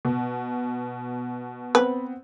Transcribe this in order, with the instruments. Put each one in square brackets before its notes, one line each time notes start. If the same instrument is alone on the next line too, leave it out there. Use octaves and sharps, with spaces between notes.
[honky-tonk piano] B2
[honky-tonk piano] B3 C4 [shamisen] B4